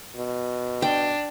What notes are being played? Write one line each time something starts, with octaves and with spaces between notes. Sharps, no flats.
B2
D4 G5